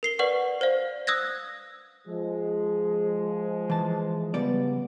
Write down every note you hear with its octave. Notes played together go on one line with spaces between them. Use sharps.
A#4 C7 G7
B4 D5 F#5 C#6
C5 D5 F5
D#6 E6 F#6 G#6 A#6
F3 G#3
E3 A5
C#3 G3 B3 D5